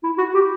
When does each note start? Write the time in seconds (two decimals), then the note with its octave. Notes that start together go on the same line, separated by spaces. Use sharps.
0.03 E4
0.18 F#4
0.34 G4